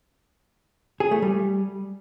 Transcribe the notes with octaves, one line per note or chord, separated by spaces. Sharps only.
G#4
A3
G3